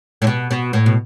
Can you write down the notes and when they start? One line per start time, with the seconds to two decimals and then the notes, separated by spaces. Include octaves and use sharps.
0.22 A2
0.27 B2
0.51 B2
0.73 A2
0.86 B2